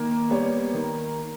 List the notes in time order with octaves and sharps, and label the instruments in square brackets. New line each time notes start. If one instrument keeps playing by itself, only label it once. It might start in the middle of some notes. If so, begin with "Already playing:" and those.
Already playing: [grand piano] D#3 [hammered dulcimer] A#3
[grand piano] G3 B3 G4 C#5
D#3